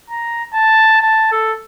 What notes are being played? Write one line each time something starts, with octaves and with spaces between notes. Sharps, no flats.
A#5
A5
A5
A4